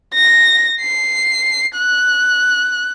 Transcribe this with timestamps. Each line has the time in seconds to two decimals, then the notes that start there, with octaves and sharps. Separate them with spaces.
0.15 A#6
0.81 C7
1.77 F#6